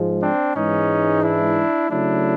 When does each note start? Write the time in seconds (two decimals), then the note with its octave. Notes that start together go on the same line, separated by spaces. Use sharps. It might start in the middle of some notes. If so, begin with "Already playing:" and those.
Already playing: G#2 F3 G#3
0.22 C4 D4
0.56 G#2 E3 G#3 C#4 D#4
1.23 D4 E4
1.90 C#3 F#3 A3 D4 E4